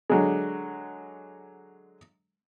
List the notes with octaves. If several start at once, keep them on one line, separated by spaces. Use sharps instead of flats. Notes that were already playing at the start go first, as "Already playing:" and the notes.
D3 F#3 G#3